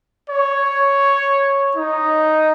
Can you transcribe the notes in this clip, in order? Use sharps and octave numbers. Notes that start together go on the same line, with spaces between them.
C#5
D#4